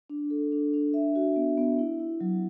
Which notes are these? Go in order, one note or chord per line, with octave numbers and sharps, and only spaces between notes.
D4
A4
D4
D4
E5
F#4
B3
B3
E4
E4
F#3